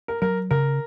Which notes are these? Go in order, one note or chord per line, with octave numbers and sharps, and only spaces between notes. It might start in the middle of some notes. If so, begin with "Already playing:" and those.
A#4
F#3 A#4
C#3 A#4